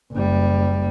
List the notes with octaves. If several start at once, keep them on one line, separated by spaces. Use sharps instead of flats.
F#1 G3